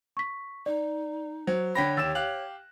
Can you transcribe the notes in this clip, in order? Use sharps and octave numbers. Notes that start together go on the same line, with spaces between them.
C#6 B6
D#4 D5
F#3 C5
D3 C#5 G5 B5 A#6 B6
D#2 G4 E6 A6 E7
G4 F5 F#6 F#7